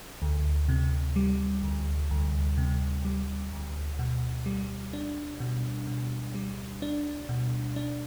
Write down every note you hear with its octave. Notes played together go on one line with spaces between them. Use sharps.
D2
C3
G3
D2
D2
C3
G3
D2
B2
G3
D4
B2
B2
G3
D4
B2
D4